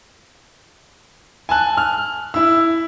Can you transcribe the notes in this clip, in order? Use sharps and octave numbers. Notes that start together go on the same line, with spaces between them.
G#5 A5 F#6
F6
E4 E6